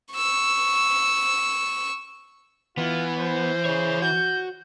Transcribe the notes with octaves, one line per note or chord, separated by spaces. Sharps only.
C#6 E6
E3 B3 F4
C5
G#4 C#5
F#4 G6